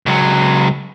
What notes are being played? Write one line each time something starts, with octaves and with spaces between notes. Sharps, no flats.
C#2 F#3